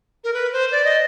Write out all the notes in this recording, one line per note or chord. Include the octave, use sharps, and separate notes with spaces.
A#4
B4
C5
D5
D#5